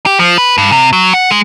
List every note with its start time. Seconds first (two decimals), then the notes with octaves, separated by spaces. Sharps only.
0.06 G4
0.19 F3
0.38 B4
0.58 G2
0.72 C3
0.93 F#3
1.14 F#5
1.30 G#3